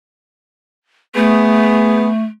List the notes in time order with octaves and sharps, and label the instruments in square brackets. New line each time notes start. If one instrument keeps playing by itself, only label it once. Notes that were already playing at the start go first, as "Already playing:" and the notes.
[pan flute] A3 [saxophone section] B3 G#4